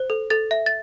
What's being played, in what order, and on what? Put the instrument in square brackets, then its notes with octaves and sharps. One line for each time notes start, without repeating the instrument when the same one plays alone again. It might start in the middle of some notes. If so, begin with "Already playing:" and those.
Already playing: [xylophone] C5
A4
A4 A6
E5
A6